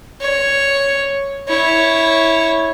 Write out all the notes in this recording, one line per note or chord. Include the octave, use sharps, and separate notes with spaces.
C#5
E4 C#5